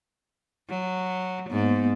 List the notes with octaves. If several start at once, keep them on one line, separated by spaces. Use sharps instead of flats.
F#3
G#2 A#3 B3